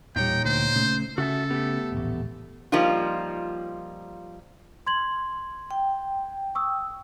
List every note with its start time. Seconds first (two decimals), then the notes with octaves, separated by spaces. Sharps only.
0.16 E1 A#2 G3 D#4 C#5 G5
0.45 D2 C5
0.76 C#3 A3
1.18 C#3 F#4 A4 E5 A5
1.50 A3 B3 G4
1.92 D#1 A1
2.72 F3 G3 A#3 D#4 F4
4.87 C6 G#6 F#7
5.71 G5
6.55 C#6 D#6 E6